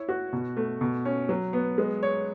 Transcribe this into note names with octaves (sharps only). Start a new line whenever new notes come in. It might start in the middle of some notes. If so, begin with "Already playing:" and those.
Already playing: E4 C#5
F#4
B2
A3
B2
C#4
F#3
B3
G#3
C#5